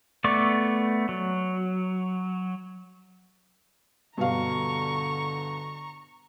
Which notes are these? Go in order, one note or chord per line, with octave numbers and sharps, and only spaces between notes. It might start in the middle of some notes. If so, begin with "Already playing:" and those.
A3 B3 D5 C#6 D6
F#3
G2 B2 D3 F5 A#5 C#6